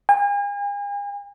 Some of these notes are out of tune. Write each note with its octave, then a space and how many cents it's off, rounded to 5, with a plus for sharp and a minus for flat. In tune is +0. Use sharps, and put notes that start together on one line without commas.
G#5 -40